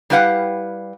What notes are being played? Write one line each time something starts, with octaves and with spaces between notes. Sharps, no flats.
G3 E4 G4 B4 F5 F#5